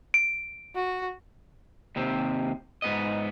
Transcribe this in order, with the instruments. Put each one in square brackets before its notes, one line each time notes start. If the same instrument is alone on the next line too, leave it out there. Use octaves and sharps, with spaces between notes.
[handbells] D7
[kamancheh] F#4
[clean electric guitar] D#2 C3 C4
G#2 B3 D#5